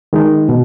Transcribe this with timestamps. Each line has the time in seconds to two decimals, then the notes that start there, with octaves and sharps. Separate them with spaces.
0.13 D#3 G#3 D#4
0.49 B2